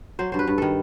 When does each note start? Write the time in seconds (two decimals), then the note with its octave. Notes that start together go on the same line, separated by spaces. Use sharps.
0.19 F#3 C5
0.32 G2 C5
0.39 B4
0.47 G2
0.58 D#3 A4